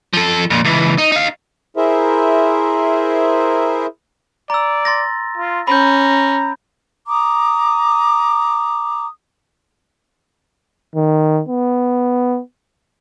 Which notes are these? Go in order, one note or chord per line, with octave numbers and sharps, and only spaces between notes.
F3 A4
F2 A#2
C#2 E3
D#4
D#4 F5
E4 G#4 A#4 C5 E5
D5 A#5 E6
C6 A6 A#6
F4
C#4 A#5 B5 G6
A#5 D6 D#6
D#3
B3